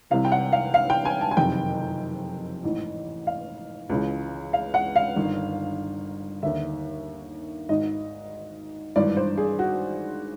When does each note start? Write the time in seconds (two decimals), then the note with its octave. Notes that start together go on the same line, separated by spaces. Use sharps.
0.10 C2 C3 E3 F5
0.25 G5
0.32 F#5
0.53 F5
0.74 F5
0.90 G5
1.05 G#5
1.21 A5
1.31 G#5
1.37 F#1 F2 C3 D#3 G5
2.63 A1 G#2 E3
3.27 F5
3.89 C#2 C#3 E3
4.53 F5
4.74 F#5
4.96 F5
5.16 G1 G2 D#3
6.43 D#2 D3 E5
7.69 G#1 G#2 D#3 D#5
8.96 G#1 G2 E3 D5
9.17 C5
9.38 G#4
9.59 F#4